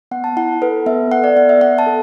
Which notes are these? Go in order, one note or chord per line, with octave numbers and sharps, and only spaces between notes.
B3 F#5
A5
E4 F#5
A4 B4
B3 E5
A4 F#5
D5
B3 F#5
E5
B3 F#5
A5
A4